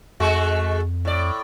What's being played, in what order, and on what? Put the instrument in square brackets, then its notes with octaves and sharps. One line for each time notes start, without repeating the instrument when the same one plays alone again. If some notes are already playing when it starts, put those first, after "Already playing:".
[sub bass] F2 [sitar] G#3 A3 F#4
[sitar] A2 D5